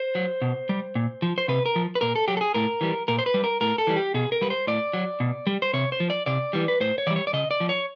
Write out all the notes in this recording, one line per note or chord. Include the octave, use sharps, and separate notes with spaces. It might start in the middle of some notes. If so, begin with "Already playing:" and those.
Already playing: C5
F#3
B2
G3
A#2
F3
C5
C3 B4
A#4
F3
B4
A#2 A#4
A4
F#3 G4
A4
G#4
A2 A#4
E3 G3
A#2 A#4
C5
B4
G3
A#4
A2 A#4
A4
E3 G3
G4
B2 G#4
A#4
G3 B4
C5
A2 D5
F#3
B2
G3
C5
C3 C#5
C5
F3
D5
C3 D5
E3 G3
B4
A2 C5
C#5
E3 G3 D5
C#5
D5
C#3 D#5
D5
F3
C#5